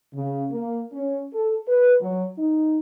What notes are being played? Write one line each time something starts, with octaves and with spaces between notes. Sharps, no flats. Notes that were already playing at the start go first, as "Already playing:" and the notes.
C#3
A#3
C#4
A4
B4
F#3
D#4